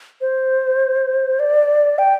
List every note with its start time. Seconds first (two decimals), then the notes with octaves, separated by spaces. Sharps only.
0.21 C5
1.40 D5
1.98 G5